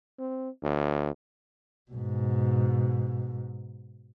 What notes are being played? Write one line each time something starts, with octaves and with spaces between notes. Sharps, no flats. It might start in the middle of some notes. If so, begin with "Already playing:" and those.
C4
D2
G#2 B2